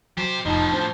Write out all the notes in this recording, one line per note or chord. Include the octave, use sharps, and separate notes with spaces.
F#3 G4 C5
F1 A2 F3 D#4
D4 C5